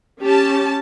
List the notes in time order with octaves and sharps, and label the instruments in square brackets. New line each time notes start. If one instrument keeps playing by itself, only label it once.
[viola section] C#4 G4 A5